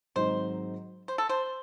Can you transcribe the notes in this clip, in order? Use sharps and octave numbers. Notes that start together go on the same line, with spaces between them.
G#2 D#3 F#3 C4 D#4 C5
C5
A4
C5